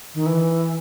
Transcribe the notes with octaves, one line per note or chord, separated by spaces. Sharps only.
D#3
E3